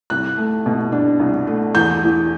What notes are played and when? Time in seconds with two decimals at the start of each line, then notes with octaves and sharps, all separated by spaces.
0.10 C2 F#6
0.37 A3
0.66 B2
0.92 D4
1.20 C2
1.47 A3
1.75 E2 G6
2.03 E3